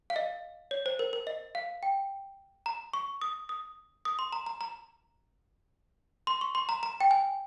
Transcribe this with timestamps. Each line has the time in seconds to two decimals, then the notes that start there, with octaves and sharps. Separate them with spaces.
0.10 F5
0.16 D#5
0.71 C#5
0.86 C5
0.99 A#4
1.13 A#4
1.27 D#5
1.55 F5
1.83 G5
2.66 A#5
2.93 C#6
3.21 D#6
3.49 D#6
4.05 D#6
4.19 C6
4.32 A#5
4.46 A#5
4.61 A#5
6.27 C6
6.41 C#6
6.55 C6
6.69 A#5
6.83 A#5
7.00 G5
7.11 G#5